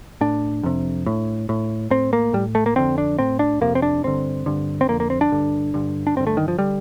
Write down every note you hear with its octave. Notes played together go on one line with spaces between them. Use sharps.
A2 D4
F2 C3
A2
A2
A2 C4
A#3
A2 G3
A3
A#3
F2 D3 C4
D4
A2 C4
D4
F2 C3 A#3
C4
D4
G2 D3 C4
G2 D3
C4
F2 D3 A#3
A#3
C4
D4
G2 D3
G2 D3
D4
G2 D3 C4
A3
D#3
F3
D3 G3